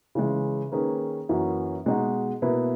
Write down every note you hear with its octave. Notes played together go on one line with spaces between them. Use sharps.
C#3 E3 G#3
D#3 A#3 C#4 G#4 B4
F#2 E3 A#3 C#4 F#4
B2 G#3 D#4 F#4
B2 A#3 E4 B4